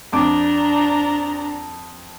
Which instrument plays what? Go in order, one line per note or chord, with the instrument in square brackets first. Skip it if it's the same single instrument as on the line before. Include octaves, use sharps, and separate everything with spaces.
[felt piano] F2 D6 [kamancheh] D4 A#5